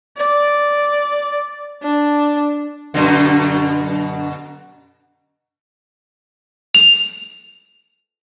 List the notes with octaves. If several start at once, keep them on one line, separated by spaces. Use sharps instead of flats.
D5
D4
F#2 B2 D3
F7